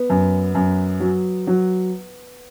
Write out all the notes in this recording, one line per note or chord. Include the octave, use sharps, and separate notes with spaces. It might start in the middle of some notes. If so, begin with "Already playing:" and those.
Already playing: B3
F#2
F#2
F#3
F#3